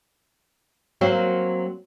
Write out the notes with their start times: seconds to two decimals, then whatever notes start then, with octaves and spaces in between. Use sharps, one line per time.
1.01 F#3 A#3 C4